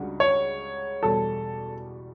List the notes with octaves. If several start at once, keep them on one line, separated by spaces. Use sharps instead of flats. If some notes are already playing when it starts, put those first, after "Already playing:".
Already playing: C#2 C#3 G3 D4 F#4
C#5
E2 B2 G3 A4